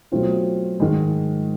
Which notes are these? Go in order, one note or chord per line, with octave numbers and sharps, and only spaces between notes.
B2 F#3 A3 C4 F4
G#2 D#3 G#3